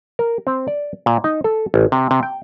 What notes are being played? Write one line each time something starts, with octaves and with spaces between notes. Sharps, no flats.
A#4
C4
D5
A#2
D#4
A4
A1
C3
C3
G5